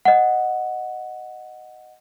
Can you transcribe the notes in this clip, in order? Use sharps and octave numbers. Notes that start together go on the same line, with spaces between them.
D#5 F#5